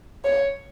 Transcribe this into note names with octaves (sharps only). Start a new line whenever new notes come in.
C#5